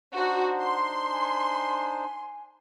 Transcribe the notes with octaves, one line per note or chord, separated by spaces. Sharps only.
D4 D#4 F#4 C5 F#5
C6
G#5